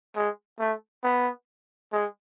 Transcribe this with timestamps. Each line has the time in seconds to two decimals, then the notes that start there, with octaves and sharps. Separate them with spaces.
0.16 G#3
0.59 A3
1.03 B3
1.92 G#3